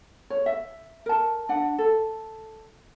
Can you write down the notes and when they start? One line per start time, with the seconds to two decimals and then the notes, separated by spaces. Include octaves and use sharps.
0.30 C#5
0.46 E5
1.06 A#4 A5
1.49 D4 F#5
1.78 A4